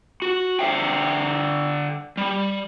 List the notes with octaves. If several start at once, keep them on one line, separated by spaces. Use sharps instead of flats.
F#4
D3 E5 G5
G3